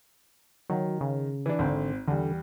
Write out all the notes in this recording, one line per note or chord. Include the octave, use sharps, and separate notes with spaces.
D#3 F#3
C#3
E3 D4
G#1 D3 C4
E2 D3 G3